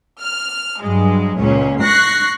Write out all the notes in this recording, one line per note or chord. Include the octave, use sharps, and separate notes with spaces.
F6
G2 F#3 G#3
C#2 A#2 C#4
C#6 F#6 A#6 C7